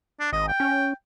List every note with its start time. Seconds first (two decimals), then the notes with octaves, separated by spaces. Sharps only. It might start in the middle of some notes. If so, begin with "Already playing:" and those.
0.20 D4
0.33 G#1 D#5
0.48 G5
0.60 C#4